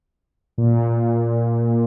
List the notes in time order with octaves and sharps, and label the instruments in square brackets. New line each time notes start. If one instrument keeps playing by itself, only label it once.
[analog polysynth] A#2